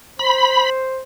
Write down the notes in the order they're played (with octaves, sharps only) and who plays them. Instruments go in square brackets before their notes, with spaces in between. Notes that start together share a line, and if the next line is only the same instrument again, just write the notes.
[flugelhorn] C5 [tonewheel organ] B5